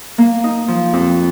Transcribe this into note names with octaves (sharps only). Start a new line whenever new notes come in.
A#3
D#4
F3
F2